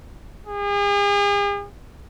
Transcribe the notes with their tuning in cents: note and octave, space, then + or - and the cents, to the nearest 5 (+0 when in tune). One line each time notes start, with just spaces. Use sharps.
G#4 -40